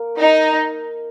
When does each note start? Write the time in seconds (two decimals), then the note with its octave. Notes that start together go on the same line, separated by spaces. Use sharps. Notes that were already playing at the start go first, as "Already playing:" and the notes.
Already playing: A#3 A#4
0.20 D#4